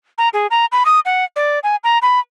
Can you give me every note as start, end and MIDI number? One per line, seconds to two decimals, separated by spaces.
0.18 0.29 82
0.33 0.47 68
0.51 0.65 82
0.72 0.83 83
0.86 1.00 87
1.05 1.24 78
1.36 1.59 74
1.63 1.76 80
1.84 1.98 82
2.02 2.19 83